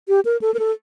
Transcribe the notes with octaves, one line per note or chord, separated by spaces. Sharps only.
G4
A#4
A4
A#4
A4